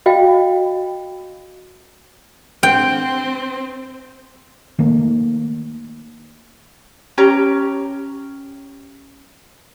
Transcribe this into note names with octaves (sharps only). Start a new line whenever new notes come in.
F#4 D#5 F5 G5
C4 G5
D#3 A3 A#3
C#4 G4 C#5 A#5